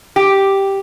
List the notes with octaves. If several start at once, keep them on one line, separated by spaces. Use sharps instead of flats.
G4